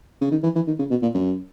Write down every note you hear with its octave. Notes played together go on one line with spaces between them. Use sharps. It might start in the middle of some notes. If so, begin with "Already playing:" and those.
C#3
D#3
E3
E3
D#3
C#3
B2
A#2
F#2